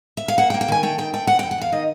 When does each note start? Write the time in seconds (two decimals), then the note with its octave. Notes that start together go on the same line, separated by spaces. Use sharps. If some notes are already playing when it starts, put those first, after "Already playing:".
0.17 E5
0.28 F5
0.38 A#3 F#5
0.50 G5
0.54 A#3
0.61 G5
0.68 D#3 G#5
0.83 A3 G5
0.98 D#3 G5
1.13 A3 G5
1.27 C3 F#5
1.39 E2 G5
1.51 F#5
1.58 E2 F5
1.72 D#3 D#5